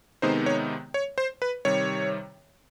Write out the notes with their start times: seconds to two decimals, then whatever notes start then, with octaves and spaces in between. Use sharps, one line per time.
0.22 C3 D#3 G#3 B3 D#4 C5
0.46 C#5
0.94 C#5
1.18 C5
1.42 B4
1.65 C3 D#3 G3 C#5